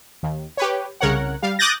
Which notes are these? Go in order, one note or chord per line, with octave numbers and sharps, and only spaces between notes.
D#2
G4 B4 C#5
C2 C#3 A#4 C#5 F#5
G3 F5
D6 D#6 F#6 G6 A6 A#6